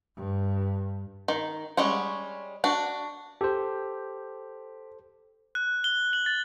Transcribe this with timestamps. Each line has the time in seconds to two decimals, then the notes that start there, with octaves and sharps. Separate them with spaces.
0.16 G2
1.28 D#3
1.77 G3 G#3 C#4 F#5
2.64 D4 F#4
3.41 G4 A4 C5
5.55 F#6
5.84 G7
6.13 F#7
6.26 A6